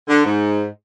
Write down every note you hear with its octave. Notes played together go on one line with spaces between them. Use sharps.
D3
G#2